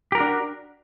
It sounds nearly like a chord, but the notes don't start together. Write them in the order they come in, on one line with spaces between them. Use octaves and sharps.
G4 A#4 F#4 D4